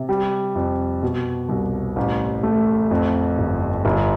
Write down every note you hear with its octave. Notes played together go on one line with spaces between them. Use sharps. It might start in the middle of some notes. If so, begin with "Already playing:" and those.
Already playing: C3
G3
F2
B2
C2
A1
A3
F2
G1
G1